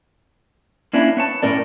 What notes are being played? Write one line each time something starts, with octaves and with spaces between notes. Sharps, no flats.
A#3 C#4 D4 E4
B3 C#5 A5
A2 C#4 A#4 D5